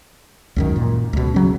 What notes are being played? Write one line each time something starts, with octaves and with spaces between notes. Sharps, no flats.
C#2 F#2 D#3
A#2
C#2 B2
C#3 F#3 C#4